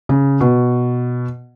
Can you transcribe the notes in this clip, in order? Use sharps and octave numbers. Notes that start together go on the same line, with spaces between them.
C#3
B2